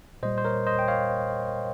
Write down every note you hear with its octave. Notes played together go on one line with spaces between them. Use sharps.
A#2 G3 C5 D#5
C5
A#4 C#5
C5 D#5
G5
C#5 F5